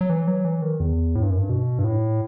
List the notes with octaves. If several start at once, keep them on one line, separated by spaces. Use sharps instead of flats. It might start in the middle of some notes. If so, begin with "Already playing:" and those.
F#3
E3
F#3
E3
D#3
E2
A2
G2
F#2
G2
B2
G2
A2